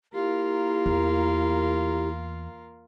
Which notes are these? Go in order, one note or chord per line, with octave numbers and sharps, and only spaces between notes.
A#3 E4 F4 G4 A#4
E2